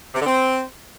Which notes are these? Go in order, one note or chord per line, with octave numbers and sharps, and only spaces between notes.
C3
D3
C4